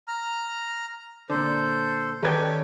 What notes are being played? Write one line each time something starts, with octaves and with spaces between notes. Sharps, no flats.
A#5 F6
A#2 D3 A4 C5
D#3 C#4 G4 A4 B4 D5 G5 G#6